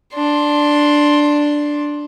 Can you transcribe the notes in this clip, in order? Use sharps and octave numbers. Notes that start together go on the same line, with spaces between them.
D4 C6